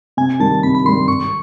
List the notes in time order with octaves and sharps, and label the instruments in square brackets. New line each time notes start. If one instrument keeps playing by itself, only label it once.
[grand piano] C3 [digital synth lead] G#5
[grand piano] D#3 G3 [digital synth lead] A5
[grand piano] C3 [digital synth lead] B5
[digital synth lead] B5
[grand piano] D#3 G3 [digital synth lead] C6
[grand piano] G#1 [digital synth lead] C#6